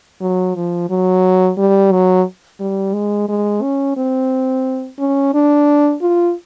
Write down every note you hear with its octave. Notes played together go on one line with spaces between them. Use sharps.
F#3
F3
F#3
G3
F#3
G3
G#3
G#3
C#4
C4
C#4
D4
F4